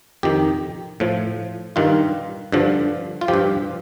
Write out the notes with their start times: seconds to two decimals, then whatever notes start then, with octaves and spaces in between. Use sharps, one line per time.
0.23 F2 D#3 G4
1.00 A2 F3
1.76 G2 D#3 F4
2.52 G2 D3 F3
3.21 F4
3.28 F3 G4
3.34 G2